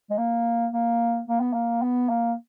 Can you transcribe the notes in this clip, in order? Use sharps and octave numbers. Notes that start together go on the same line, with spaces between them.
G#3
A#3
A#3
A#3
B3
A#3
B3
A#3